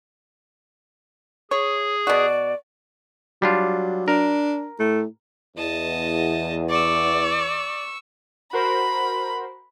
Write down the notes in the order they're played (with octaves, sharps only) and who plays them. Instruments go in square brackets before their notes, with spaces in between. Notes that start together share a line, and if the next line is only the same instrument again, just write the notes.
[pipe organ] G#4 [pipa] C#5
[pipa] B2 F#4 [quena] D5
[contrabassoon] F#3 [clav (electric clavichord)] G3 D4 F4
[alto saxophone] D4 [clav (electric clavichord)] A#4
[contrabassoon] A2 [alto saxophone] A3
[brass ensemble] E2 [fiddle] D#5 A5
[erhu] D5 [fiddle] C#6 E6
[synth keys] F#4 A#4 C5 [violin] B5